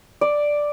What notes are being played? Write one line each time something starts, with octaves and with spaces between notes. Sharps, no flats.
D5